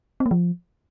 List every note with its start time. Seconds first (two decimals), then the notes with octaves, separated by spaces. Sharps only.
0.20 C4
0.26 A#3
0.31 F3